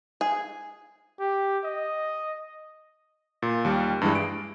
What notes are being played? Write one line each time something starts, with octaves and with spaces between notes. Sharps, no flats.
G#4
G4
D#5
A#2
D#2 G3
G2 E3 G#3
D7